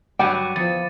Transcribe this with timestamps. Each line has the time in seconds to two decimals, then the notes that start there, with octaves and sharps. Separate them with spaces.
0.19 G2 F#3 G3 G5 D6 C#7 D#7
0.56 E2 F3 A6 C#7